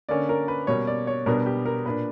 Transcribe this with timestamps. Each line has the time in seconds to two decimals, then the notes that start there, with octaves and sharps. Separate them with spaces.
0.09 D3 A#3 C#4 D5
0.29 A#4
0.48 B4
0.67 B2 G3 A#3 C#5
0.87 D5
1.07 C#5
1.26 B2 G3 B3 D4 A#4
1.46 G4
1.66 A#4
1.85 A#2 A#3 D4 B4